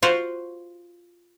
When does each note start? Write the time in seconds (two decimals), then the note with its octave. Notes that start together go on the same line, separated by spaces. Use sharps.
0.03 F4 F#4 C5